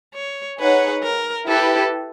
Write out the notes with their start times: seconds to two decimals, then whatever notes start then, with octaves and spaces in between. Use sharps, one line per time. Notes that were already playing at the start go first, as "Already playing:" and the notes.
0.14 C#5
0.59 D#4 G#4 B4 C#5 F#5
1.03 A#4
1.47 E4 G4 A4 B4